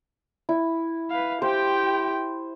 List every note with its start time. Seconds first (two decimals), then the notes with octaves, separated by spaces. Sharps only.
0.49 E4
1.10 B4 F5
1.42 G4 C5 G5